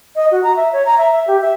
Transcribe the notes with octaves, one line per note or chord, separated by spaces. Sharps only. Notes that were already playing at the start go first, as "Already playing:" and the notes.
D#5
F#4
A#5
E5
C#5
A#5
E5
E5
G4
E5